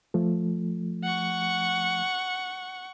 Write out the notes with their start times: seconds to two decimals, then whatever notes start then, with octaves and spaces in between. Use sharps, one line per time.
0.14 F3 A3
1.04 F#5 C#6